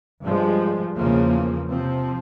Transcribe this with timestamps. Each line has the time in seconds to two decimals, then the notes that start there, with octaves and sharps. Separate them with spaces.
0.22 G2 F3 G#3
0.95 E2 C#3 F3 A#3
1.68 C3 F3 C4